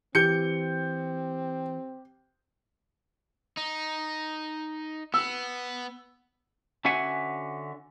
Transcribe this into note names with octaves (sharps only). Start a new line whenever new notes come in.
E3 C4 G4 G6 C#7
D#4
B3 E6
D3 C#4 F#4 E5 F#5 G#5